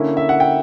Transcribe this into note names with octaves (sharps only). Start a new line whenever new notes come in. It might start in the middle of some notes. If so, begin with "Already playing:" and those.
Already playing: D3 A#3 C#4 E4
E5
F#5
G5